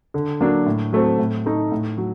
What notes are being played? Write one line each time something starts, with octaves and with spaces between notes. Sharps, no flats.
D3
F#3 A#3 D4
A2
F#3 A3 C4
A2
A3 D#4
A2
F#3